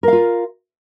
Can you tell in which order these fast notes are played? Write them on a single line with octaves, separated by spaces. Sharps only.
A#4 F5 F4